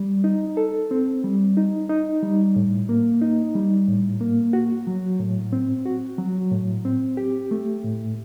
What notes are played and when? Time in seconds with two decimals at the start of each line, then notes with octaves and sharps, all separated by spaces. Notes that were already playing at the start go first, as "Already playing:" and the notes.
Already playing: G3
0.24 D#4
0.57 A4
0.91 C4
1.24 G3
1.57 D#4
1.90 D#4
2.23 G3
2.56 A2
2.89 A#3
3.21 D#4
3.55 G3
3.88 A2
4.21 A#3
4.53 F#4
4.87 F#3
5.20 A2
5.53 C4
5.85 F#4
6.18 F#3
6.52 A2
6.85 C4
7.17 G4
7.51 A3
7.84 A2